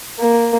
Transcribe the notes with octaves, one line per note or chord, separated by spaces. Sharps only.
A#3